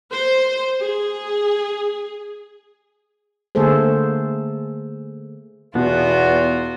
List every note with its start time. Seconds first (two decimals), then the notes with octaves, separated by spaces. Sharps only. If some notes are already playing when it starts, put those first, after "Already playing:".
0.13 C5
0.80 G#4
3.55 D3 A3 A#3 G#4 A4 C5
5.75 E2 B2 B3 F4 F#4